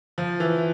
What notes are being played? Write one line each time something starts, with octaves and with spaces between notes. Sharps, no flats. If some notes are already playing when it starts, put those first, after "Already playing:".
F3
E3